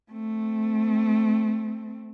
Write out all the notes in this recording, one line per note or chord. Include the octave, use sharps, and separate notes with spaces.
A3 C4